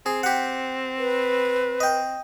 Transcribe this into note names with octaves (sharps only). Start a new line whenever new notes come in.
C4 G#4
G4 F#5
B4
D#5 G5